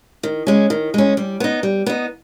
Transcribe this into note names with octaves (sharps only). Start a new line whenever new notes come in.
D#3
G#3 C#4
D#3
G#3 C#4
G3
B3 D#4
G3
B3 D#4